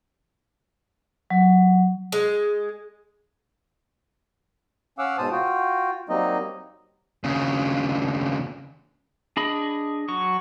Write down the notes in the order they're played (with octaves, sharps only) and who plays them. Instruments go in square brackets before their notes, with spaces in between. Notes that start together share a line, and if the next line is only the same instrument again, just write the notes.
[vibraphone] F#3
[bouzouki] G#3
[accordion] C#4 F5 F#5 D6 E6
G#2 B2 C5 A5 D#6
F4 F#4 G5
F#3 G3 A#3 C4 D#4 D#5
[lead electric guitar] D#2 C#3
[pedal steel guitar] D4 G#4 D#5 B5
F#3 C#6